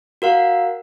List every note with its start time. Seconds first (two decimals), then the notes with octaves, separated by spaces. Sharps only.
0.22 F#4 A#4 F5 F#5